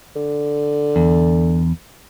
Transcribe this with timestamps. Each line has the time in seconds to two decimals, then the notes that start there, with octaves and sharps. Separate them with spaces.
0.16 D3
0.96 E2